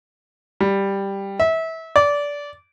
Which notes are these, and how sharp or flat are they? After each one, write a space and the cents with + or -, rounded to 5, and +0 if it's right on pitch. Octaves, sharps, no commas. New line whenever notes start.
G3 +5
E5 -25
D5 -20